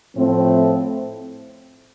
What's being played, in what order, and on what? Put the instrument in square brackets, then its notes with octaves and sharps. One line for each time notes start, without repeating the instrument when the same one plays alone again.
[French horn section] A2 F3 A3 C4